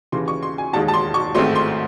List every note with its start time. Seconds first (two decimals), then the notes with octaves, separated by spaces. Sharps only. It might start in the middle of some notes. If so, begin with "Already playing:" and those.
0.12 D#2 C#3 E3 C6
0.28 C#6
0.43 C6
0.58 G#5
0.73 E1 D#2 D#3 G#3 A5
0.88 A5
0.94 C6
1.14 C#6
1.34 A1 G#2 D#3 A3 C4 C6
1.55 C6